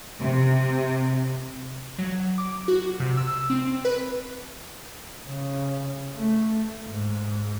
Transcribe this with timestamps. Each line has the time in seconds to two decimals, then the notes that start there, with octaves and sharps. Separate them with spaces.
0.20 C3
1.98 F#3
2.38 D6
2.68 F#4
3.00 C3
3.17 E6
3.50 C4
3.85 B4
5.27 C#3
6.15 A3
6.87 G#2